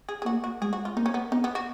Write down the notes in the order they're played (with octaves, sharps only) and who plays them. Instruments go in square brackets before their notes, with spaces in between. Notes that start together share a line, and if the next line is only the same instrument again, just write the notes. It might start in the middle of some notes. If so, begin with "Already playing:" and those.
[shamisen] G#4
G#4
[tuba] A#3 [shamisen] F#4
[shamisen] F#4
[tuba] G#3 [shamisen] G#4
[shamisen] F#4
F4
[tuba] A#3 [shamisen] D#4
[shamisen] C#4
B3
[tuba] B3 [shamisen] D#4
[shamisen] B3
F#4